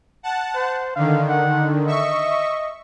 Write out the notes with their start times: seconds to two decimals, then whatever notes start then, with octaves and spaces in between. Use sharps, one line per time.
0.23 F#5 A5
0.55 C5
0.96 D3 D#3 F5
1.29 F#5
1.87 D#5 E5 C#6